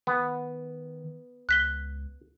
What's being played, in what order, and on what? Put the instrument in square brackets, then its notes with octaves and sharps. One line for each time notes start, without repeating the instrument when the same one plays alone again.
[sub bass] D#3 [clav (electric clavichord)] B3
[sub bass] C#2 [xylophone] F#6 B6 G7